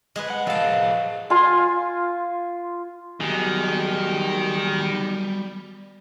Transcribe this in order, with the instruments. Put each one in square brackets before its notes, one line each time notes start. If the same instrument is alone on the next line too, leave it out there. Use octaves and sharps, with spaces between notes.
[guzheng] G#3 G#4 B4
[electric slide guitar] F#5
[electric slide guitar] F3 G#4 F5 [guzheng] A4 A5
[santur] F4 G#5 C6
[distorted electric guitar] D#3 [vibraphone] F#3 B3 F#4 [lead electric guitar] G3 G#4